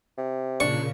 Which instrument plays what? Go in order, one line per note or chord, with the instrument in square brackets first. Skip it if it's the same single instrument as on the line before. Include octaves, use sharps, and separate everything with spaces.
[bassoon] C3
[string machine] A#2 C#3 [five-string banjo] D4 [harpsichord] C#6